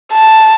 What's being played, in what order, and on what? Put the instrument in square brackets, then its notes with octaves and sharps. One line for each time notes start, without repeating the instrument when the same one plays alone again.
[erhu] A5